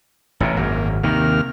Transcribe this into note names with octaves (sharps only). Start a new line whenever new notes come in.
A1 A2 C3
G#1 F#2 A#3
D#2 C3 D#3 A#3 F6